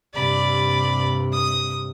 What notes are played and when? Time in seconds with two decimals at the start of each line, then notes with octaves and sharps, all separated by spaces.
0.14 G2 C3 D5 B5
1.33 D#6